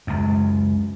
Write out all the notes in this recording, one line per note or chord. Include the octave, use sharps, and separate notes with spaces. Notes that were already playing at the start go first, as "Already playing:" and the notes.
C#2 F#2